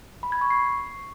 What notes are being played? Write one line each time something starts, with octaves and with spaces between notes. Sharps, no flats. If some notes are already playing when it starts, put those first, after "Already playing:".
B5
G#6
C#6
C7